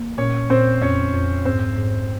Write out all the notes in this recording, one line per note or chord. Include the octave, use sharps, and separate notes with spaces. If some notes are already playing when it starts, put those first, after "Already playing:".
Already playing: A#3
A#2 C#4 C#5
A#2 C4 C5
F2 C#4 C#5
F2
G#2 C4 C5
G#2